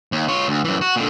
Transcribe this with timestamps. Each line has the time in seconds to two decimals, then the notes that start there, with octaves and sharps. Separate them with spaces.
0.12 D#2
0.28 F4 C#5
0.48 D2
0.64 F#2 E3
0.81 F#4
0.96 A#2 D3